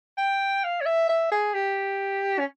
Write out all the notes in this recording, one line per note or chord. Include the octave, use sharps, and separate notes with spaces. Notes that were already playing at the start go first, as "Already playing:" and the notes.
G5
F5
C#5
E5
E5
G#4
G4
C#4